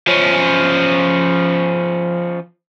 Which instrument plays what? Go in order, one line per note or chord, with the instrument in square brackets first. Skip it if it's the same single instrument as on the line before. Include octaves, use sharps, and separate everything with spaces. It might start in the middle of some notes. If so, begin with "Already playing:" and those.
[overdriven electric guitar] F3 C#4